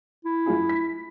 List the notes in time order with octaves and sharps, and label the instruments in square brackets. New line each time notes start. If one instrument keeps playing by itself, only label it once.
[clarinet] E4
[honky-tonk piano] F#2 F4 G#4
B6